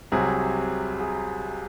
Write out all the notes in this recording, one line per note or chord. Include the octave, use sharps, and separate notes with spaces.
C2 C3 F#3 G#4
G#4